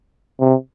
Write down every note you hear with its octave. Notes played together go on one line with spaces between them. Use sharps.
C3